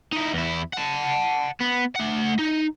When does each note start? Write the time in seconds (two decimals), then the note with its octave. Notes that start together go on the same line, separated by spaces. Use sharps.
0.12 D#4 E4
0.33 E2 E4
0.73 F#5 A5
1.61 B3
1.96 A3 F#5
2.39 D#4